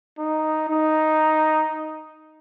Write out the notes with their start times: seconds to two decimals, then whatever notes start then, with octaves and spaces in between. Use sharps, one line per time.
0.18 D#4
0.69 D#4